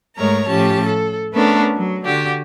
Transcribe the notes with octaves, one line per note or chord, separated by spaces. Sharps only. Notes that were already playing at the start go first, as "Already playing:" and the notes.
G#2 G#3 A3 A#4 C#5 A#5
A2 F3 C#4 G4 A5
A4
A3 B3 C#4 D4 A4 A#4
F#3
D3 F#4 G4